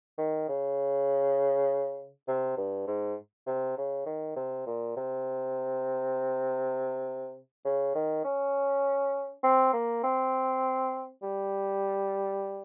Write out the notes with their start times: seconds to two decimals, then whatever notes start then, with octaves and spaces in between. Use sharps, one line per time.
0.18 D#3
0.49 C#3
2.28 C3
2.58 G2
2.87 G#2
3.47 C3
3.77 C#3
4.06 D#3
4.36 C3
4.66 A#2
4.97 C3
7.65 C#3
7.95 D#3
8.25 C#4
9.44 C4
9.73 A#3
10.04 C4
11.23 G3